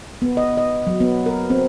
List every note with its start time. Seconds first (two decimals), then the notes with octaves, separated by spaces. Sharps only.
0.22 B3
0.37 D#5
0.57 D#5
0.87 F#3
1.00 B3
1.26 A#4
1.50 C4